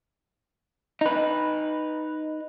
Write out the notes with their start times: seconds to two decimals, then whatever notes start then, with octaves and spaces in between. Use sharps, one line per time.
1.01 D#4 B4